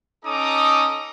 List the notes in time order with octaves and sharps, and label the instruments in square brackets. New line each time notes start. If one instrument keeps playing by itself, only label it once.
[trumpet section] C#4 D#4 A4 A#5 D6 D#6